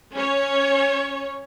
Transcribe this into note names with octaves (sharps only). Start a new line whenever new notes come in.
C#4 C#5